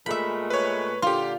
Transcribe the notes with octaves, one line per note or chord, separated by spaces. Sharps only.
A#2 G#3 A3 E5 B5
B4 C#5
A#2 D3 F4 G4 C6